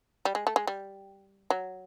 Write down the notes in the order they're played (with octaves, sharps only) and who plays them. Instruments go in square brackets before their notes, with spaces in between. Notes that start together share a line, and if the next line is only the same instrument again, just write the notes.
[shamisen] G3
G#3
A3
G#3
G3
F#3